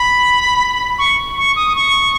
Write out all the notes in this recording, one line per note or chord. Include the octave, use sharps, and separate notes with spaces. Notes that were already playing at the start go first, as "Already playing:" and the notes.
Already playing: B5
C#6
C#6
D#6
C#6